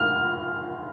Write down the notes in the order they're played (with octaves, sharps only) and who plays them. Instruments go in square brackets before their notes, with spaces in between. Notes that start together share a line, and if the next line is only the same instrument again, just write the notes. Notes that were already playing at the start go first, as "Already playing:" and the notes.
Already playing: [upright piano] F6